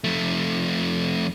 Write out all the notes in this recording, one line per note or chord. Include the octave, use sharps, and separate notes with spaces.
F2 A3